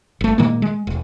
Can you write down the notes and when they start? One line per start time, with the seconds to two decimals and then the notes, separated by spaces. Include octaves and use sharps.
0.21 G1 A3
0.38 A#2 D#3 G#3 A#3
0.62 G#3
0.87 E1